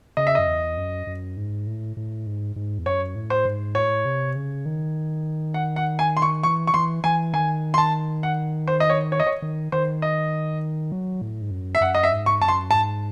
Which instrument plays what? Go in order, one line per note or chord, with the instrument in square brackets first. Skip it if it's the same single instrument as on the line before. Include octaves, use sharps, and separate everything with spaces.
[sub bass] C#3 [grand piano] D#5
[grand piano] E5
[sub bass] F#2 [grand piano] D#5
[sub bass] E2
F#2
F#2
G#2
A2
A2
G#2
G#2
E2
[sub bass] F#2 [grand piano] C#5
[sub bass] A2
[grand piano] C5
[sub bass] G#2
[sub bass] A2 [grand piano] C#5
[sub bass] C3
C#3
D#3
[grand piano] F#5
F#5
G#5
C6
C#6
[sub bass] E3 [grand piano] C#6
[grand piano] C#6
[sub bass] E3 [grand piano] C6
[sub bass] E3 [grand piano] G#5
[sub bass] D#3 [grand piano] G#5
[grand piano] C6
A5
F#5
C5
D#5
C#5
C#5
D#5
C#5
[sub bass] D#3
[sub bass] D#3 [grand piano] C5
[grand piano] D#5
[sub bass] F#3
A2
G#2
F#2
[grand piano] E5
[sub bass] F#2 [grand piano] F#5
[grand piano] D#5
E5
[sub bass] G#2
[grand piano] C#6
[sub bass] F#2 [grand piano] A5
[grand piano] C6
[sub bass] G#2 [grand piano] A5